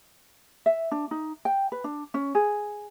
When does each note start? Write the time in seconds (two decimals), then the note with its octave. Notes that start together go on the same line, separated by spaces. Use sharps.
0.66 E5
0.92 D4
1.11 D#4
1.45 G5
1.72 B4
1.84 D4
2.14 C#4
2.35 G#4